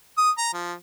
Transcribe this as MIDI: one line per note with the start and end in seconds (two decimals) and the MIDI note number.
0.18 0.30 87
0.38 0.49 82
0.54 0.73 53